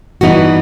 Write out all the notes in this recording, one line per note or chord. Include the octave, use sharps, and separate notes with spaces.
G2 E3 B3 D#4 F#4